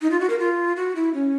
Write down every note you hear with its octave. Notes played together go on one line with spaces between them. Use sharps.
D#4
F4
F#4
A#4
F4
F#4
E4
C#4